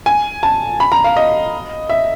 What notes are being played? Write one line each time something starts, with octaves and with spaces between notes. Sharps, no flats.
G#5
A5
B5
A#5
F5
D#5
E5